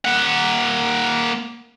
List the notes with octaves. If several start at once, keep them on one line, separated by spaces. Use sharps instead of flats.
A#3 F#5